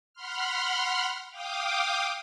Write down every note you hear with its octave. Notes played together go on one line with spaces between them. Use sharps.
F#5 B5 C6 F6
F5 G5 D6 D#6